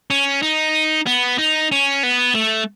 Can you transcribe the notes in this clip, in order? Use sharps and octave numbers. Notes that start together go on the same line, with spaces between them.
C#4
D#4
B3
D#4
C#4
B3
A3